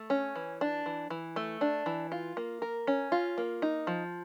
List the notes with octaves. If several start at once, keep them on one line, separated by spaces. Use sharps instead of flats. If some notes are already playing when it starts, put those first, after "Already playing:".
Already playing: A3
C#4
E3
D4
E3
E3
A3
D4
E3
F4
A#3
A#4
C#4
F4
A#3
D#4
F3